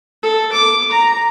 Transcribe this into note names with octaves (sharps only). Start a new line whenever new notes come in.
A4
D6
A#5